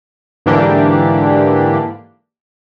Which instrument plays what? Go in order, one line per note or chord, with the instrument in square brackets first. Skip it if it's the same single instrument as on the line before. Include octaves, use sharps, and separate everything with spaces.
[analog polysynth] G#2 D3 E3 A#3 D4 G4